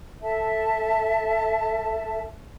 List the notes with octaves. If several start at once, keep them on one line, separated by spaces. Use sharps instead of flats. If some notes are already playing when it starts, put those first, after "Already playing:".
A4 E5 A5